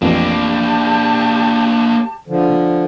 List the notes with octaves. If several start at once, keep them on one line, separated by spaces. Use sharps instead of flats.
A1 F2 A#3 D4 G4 A5
D3 F3